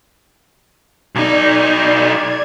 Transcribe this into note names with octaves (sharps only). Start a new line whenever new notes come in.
B1 D#4 D5 G#6